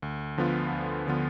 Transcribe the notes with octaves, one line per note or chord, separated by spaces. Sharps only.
D2
D3 F3 B3 F4
D2
D3 F3 B3 F4